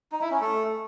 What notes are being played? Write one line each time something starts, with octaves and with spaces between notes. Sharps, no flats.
D#4
E4
C#4
A3